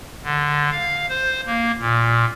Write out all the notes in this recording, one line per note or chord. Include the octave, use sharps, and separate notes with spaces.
D3
F5
C5
A#3
A#2